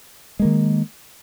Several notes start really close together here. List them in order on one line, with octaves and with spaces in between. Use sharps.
G#3 A#3 D#3